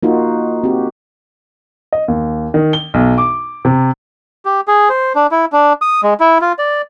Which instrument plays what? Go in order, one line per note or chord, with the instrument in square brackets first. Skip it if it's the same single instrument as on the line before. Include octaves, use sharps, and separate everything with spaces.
[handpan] A#3 D#4 F4 F#4
C4 F#4 G4
[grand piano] D#5
D#2
D#3
G7
B1
D6
C3
[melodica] G4
G#4
C5
D4
E4
D4
D#6
G#3
E4
F4
D5